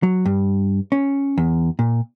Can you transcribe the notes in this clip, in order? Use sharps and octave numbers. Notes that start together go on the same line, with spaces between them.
F#3
G2
C#4
E2
A#2